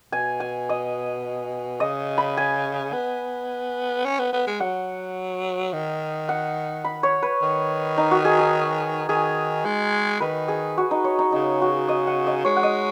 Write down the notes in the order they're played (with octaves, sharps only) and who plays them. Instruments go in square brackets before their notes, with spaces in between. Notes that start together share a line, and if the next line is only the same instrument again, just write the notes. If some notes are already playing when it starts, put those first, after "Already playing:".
[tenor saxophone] B2 [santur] G#5
[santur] G#5
D#5
[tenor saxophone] C#3 [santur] D#5
[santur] B5
G#5
[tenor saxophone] B3
C#4
B3
B3
G#3
[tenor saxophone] F#3 [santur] F#5
[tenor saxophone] D#3
[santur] F#5
B5
C#5
B4
[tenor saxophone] D#3
[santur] D#4
F#4
G#4
G#4
[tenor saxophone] D#3 [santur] G#4
[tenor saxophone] G#3
[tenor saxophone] D#3 [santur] B4
[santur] G#4
F#4
D#4
C#5
D#4
[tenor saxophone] C#3 [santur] D#4
[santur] F#4
D#5
F#5
D#5
[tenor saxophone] G#3 [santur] C#5
[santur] F#5
D#5